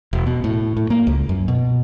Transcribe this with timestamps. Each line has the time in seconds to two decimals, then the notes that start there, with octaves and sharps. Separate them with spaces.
0.13 E1
0.27 B2
0.44 A2
0.77 A2
0.90 A#3
1.07 C#2
1.29 F#2
1.48 B2